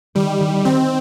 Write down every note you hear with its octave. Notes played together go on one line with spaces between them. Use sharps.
D#3 G3
D#3
D#3 C4